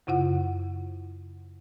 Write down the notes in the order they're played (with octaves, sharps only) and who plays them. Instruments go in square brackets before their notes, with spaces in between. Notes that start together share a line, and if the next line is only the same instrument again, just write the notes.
[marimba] F#2 C#3 E4 F4 F#5